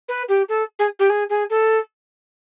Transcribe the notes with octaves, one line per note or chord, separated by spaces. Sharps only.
B4
G4
A4
G#4
G4
G#4
G#4
A4